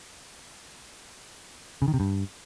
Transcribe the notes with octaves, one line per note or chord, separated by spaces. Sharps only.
C#3
D#3
C3
G2